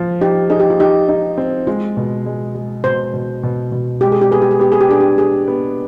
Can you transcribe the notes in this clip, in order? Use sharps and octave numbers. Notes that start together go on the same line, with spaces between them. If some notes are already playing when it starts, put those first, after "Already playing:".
Already playing: F3
D#4 G4
D#4 G#4
G4
F4
D#4 G4
D#4
C4
G#3 F4
B2
G#3
G#3
B2 C5
B2
B2
B2
G#3 G4
G#4
G4
B3 G#4
G4
G#4
B3 G4
G#4
G4
D4 G#4
G4
G4 G#4
B3